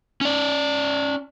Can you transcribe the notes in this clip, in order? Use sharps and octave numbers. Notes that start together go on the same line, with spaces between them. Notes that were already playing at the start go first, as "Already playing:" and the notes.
C#4 D5